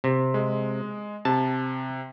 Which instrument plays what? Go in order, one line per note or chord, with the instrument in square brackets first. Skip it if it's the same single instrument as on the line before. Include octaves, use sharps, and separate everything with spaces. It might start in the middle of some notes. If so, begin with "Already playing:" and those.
[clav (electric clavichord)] C3
[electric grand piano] G#3
[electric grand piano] C3 [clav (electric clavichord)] A5